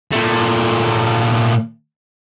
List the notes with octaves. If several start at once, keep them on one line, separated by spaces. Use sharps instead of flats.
A#2 A3